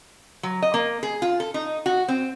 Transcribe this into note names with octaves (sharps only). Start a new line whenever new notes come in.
F#3
D#5
A#3
G#4
F4
A4
D#4
F#4
C4